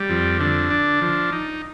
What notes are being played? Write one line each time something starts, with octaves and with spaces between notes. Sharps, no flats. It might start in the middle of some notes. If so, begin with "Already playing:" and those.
Already playing: G3
F2
D3
D4
F3
D#4